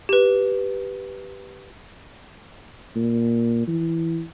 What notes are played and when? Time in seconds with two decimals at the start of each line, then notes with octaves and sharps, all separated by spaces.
0.09 G4 B4
2.96 A#2
3.67 E3